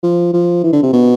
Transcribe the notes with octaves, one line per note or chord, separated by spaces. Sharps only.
F3
F3
E3
D3
C3
B2